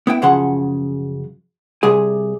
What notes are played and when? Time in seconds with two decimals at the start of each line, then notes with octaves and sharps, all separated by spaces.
0.07 B3 E4 G5
0.22 F#2 C#3 F3 G#4 F#5 C6
1.83 C2 C3 G3 G#4 G#5